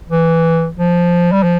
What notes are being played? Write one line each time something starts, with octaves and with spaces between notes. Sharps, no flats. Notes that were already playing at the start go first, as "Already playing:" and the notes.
E3
F3
G3
F3